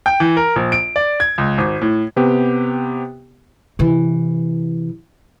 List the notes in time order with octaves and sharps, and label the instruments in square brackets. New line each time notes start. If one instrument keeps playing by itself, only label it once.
[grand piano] G5
E3
A#4
A#1
D7
D5
G#6
C#2
G#1
A2
[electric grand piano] C3 B3 G4
[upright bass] C3 E3